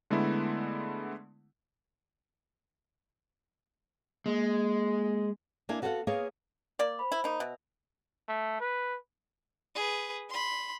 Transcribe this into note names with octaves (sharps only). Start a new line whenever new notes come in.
D3 G#3 A3 B3 E4
G#3 A#3
A#3 D4 E4 G#5
B3 F#4 A4 B4 F5 F#5
A#3 B3 G#4 A#4 C#5 F5
A#3 D5
C5 B5
E4
A#3 D#4
B2 E5
A3
B4
G#4 B4
B5 C6